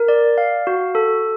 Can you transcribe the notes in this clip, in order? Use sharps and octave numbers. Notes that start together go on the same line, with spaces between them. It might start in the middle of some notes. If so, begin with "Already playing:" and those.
Already playing: A#4
D5
F5
F#4
A4